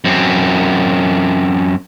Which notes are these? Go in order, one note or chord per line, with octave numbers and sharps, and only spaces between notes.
F#2 C4